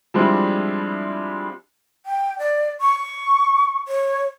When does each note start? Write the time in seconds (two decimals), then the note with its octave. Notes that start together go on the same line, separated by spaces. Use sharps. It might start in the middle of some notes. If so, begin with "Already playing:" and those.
0.14 F3 G3 G#3 C4 D4 E4
2.06 G5
2.39 D5
2.81 C#6
3.88 C#5